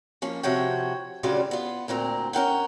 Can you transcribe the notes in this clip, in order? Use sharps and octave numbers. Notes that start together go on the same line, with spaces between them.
F3 A#3 C#4
C3 F3 F#4 C#5 G5
D2 C#3 F#3 G3 F4 D5
B3 F4
D2 A#2 C4 A#4
C#4 A#4 F#5 G5